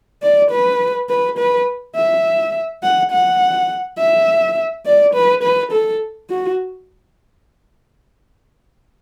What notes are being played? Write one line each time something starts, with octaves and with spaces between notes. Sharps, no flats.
D5
B4
B4
B4
E5
F#5
F#5
E5
D5
B4
B4
A4
F#4